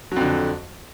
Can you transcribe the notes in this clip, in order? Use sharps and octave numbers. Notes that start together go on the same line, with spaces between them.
F2 D3 F#3